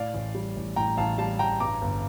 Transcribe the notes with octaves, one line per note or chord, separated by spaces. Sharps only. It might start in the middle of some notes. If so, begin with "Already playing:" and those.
Already playing: A2 D5 F5
A1
G3
A1
A2 G5 A#5
A1 F5 A5
G3 F5 A5
A1 G5 A#5
G2 A#5 D6
G1